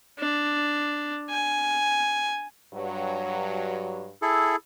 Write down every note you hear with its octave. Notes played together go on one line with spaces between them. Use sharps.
D4
G#5
G2 F#3
E4 G#4 A4